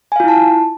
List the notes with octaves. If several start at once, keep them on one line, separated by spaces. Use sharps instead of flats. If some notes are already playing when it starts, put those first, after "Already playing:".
E4 F4 F5 G#5 A5